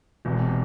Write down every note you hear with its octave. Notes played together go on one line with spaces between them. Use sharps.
E1 E2 C3